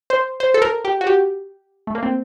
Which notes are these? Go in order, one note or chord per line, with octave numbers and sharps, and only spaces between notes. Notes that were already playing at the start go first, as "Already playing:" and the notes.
C5
C5
A4
A#4
G4
F#4
G4
A3
A#3
C4